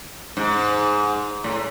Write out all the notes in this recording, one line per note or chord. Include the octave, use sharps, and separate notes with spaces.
G#2
A2